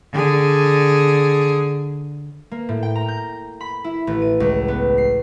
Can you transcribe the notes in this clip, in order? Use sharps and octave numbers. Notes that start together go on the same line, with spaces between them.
D3 G#4
A#3
A2
G5
A#5
G6
B5
E4
A1
D#7
C#2
B3
C7